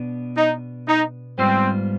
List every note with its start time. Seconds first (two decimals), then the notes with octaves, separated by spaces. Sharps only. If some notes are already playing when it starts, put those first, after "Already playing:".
Already playing: B2 B3 D4
0.37 D#4
0.87 D#4
1.38 G#2 G3 B3 C4 F4 C5